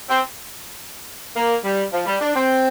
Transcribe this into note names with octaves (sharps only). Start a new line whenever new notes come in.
C4
A#3
G3
F3
G3
D4
C4